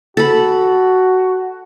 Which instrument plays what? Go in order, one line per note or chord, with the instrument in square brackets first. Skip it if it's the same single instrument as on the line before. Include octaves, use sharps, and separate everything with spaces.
[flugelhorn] F#4 [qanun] A4 B5